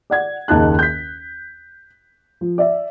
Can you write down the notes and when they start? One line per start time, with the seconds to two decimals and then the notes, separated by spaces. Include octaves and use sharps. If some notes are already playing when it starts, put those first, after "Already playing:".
0.10 D5 F#5 G#6
0.48 F#1 D#2 D#4 A5 F#6
0.79 G6 B6
2.41 F3
2.58 D5 E5